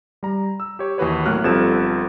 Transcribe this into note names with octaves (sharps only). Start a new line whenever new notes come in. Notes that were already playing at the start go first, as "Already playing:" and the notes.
G3 A#5
E6
G4 C#5
D#2 E3 F#4 B4 C#5
G#1 A2 F#3 A#3 F6 F#6
G1 F3 G3 C4 A4 E7